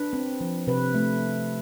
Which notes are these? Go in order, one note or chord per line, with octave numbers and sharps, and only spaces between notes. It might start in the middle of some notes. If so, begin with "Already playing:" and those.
Already playing: D4 B4
C4
F3
C3 B4
A3